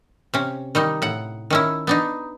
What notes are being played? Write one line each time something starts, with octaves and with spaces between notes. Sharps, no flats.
C3 C#4
D#3 G3 D#4
A2 F#5
D#3 C#4 E4
B3 D4 D#4